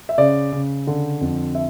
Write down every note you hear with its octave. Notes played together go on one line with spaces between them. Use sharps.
E5
C#3 D5
C#3
D3
F2
E5